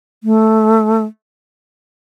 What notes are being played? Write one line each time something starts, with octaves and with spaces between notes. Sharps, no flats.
A3